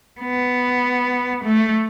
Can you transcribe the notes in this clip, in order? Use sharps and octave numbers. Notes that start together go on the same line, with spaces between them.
B3
A3